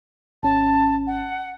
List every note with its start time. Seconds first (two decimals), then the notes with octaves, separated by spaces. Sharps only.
0.43 G#1 C#4 A5
1.07 F#5